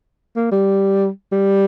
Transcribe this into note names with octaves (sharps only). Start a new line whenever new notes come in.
A#3
G3
G3